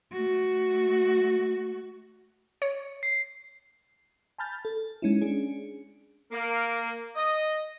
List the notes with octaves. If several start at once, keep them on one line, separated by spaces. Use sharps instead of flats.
A3 F#4
C#5
C7
G#5 A5 B5 F6 G6 A6
A4
G#3 C#4 D#4 E4
C#4 D4 G#4
A#3
D#5